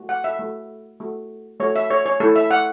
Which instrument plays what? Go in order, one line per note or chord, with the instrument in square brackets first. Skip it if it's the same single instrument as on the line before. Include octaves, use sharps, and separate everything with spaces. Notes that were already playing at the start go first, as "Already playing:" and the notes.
Already playing: [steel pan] A3 F#4
F#5
E5
A3 F#4
A3 F#4
A3 F#4 C#5
E5
C#5
C#5
A3 E4 A4
E5
F#5